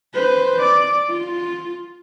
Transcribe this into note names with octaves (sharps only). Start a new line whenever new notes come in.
B4 C5
D5
F4